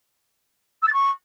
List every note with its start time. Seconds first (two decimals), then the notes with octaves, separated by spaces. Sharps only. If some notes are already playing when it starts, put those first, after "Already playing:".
0.82 E6
0.87 A6
0.92 C#6